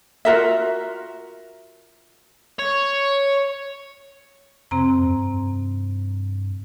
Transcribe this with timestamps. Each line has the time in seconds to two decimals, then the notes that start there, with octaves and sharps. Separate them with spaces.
0.25 F4 F#4 A#4 E5
2.59 C#5
4.71 F2 C3 C4 A#5
5.04 G2